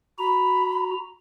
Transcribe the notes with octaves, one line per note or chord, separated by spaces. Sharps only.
F#4 A#5 B5